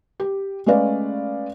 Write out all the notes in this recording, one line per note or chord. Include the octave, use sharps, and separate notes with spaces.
G4
G#3 A3 C#4 B4 D5 F5